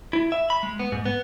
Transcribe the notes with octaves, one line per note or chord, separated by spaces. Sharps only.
E4
E5
B5
G#3
B3
G#2
B3